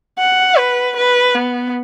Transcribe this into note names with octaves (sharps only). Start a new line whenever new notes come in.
F#5
B4
B4
B3